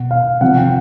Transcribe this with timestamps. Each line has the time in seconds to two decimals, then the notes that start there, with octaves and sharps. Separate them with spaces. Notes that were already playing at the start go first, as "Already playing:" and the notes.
Already playing: B2 F#5
0.11 F5
0.41 C3 F3 F#5
0.58 G5